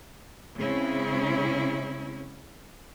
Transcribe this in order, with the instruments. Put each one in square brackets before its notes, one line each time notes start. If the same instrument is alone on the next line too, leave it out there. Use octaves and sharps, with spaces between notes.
[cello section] C#3 G#3 C4 C#4 E4